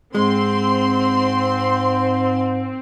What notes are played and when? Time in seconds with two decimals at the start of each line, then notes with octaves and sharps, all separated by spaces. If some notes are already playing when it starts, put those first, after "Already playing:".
0.15 G#2 G#3 C4 C6